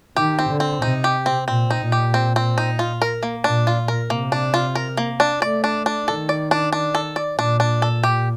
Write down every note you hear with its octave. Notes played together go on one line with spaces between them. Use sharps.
D#3 G4
C4
D3
C4
C3 D#4
G4
C4
A#2 C4
D#4
A#2
G4
C4
C4
D#4
F4
A#4
A#3
A#2 D4
F4
A#4
C3 A#3
D4
F4
A#4
A#3
D4
A3 D5
D4
D4
D#3 A4
D5
D4
D4
A4
D5
A#2 D4
D4
A4
G4